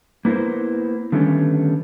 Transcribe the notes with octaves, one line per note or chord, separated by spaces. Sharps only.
A#3 B3 E4 A#4 C5
D3 D#3 G3 A3 B3 C#4